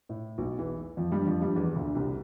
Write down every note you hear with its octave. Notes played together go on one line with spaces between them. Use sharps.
A2
B1 B2
E2 E3
F2 F3
G2 G3
F2 F3
G2 G3
E2 E3
D2 D3
C2 C3